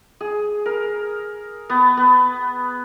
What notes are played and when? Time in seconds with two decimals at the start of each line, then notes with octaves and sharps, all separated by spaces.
0.21 G#4
0.66 A#4
1.70 B3
1.97 B3